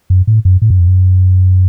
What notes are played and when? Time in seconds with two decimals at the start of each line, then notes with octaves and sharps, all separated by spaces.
0.10 F#2
0.27 A2
0.45 F#2
0.62 A2
0.70 F#2
0.79 F2
0.87 F#2